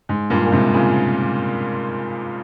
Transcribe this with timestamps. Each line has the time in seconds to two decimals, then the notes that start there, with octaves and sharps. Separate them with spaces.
0.09 G#2
0.30 G2 A#2
0.46 A#2
0.52 G#2 C3
0.74 A#2 C#3